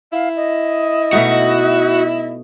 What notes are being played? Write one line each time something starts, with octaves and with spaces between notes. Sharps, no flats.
E4 F5
D#5
B2 A3 D#4 F#4